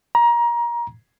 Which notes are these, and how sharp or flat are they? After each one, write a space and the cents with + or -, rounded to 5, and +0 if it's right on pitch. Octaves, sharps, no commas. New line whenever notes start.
A#5 +25